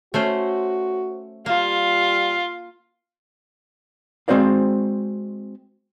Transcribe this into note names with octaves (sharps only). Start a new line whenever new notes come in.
A3 C#4 F#4 C5
G3 A#3 F4
G#3 C4 F#4 C5 D5 F5